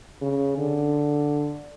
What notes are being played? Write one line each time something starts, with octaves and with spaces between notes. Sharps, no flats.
C#3
D3